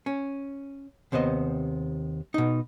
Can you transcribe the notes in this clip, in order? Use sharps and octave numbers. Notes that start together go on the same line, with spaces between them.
C#4
D#2 C3 B3 C5 D#5
B2 D#4